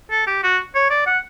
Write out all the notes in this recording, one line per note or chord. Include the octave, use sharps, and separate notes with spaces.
A4
G4
F#4
C#5
D5
F#5